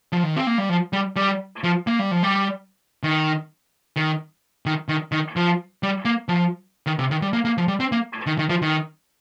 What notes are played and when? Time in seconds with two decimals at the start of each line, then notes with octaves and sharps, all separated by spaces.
0.12 F3
0.23 D#3
0.36 C4
0.47 A#3
0.58 G3
0.69 F3
0.93 G3
1.16 G3
1.64 F3
1.87 A#3
1.99 G3
2.11 F3
2.23 G3
3.03 D#3
3.96 D#3
4.66 D#3
4.89 D#3
5.12 D#3
5.36 F3
5.83 G3
6.05 A#3
6.29 F3
6.86 D#3
6.99 C3
7.11 D#3
7.22 G3
7.33 A#3
7.45 A#3
7.58 F3
7.68 G3
7.80 C4
7.92 A#3
8.26 D#3
8.38 D#3
8.49 F3
8.62 D#3